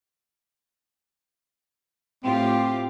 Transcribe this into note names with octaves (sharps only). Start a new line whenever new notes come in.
A2 C4 F4 G4